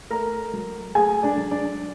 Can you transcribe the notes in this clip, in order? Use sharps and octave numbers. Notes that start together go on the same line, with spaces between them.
A3 A#4 A#5
F#3
A3 G#4 G#5
D4 D5
F#3
D4 D5